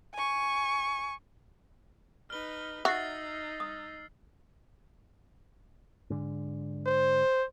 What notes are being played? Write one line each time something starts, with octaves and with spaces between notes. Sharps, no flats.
G#5 C#6
D#4 B4 F6 G7
D#4 F#4 E5 E6 A6 C7
D#6
G#2 D3
C5